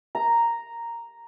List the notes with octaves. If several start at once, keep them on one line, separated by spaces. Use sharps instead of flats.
A#5